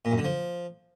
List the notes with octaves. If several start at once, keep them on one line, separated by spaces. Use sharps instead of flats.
A#2
F#2
D3
F3